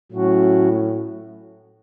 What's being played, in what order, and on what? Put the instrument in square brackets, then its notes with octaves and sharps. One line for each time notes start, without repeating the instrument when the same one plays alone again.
[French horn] A2 [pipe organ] F#3 A3 C#4 F#4